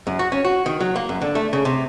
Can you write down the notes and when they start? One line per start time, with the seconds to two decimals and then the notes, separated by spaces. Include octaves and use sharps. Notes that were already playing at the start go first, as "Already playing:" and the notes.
0.07 F#2
0.19 F#4
0.32 C#4
0.45 F#4
0.66 D#3
0.80 F#3
0.96 A#3
1.09 F#2
1.22 D3
1.35 A3
1.53 C#3
1.65 C3